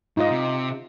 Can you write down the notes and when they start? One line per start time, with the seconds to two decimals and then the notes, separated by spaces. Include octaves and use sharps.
0.17 G#2 D#4 F4 D#5
0.30 C3